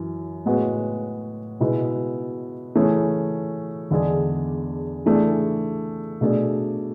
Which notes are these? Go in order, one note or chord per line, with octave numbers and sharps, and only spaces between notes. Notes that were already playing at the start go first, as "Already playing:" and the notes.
Already playing: F#2 E3
A2 G#3 B3 F#4
B2 G#3 B3 E4 G#4
E3 A3 C#4 G#4
E2 D3 G#3 D4 G#4
E3 A3 D4 G#4
B2 A3 D4 G#4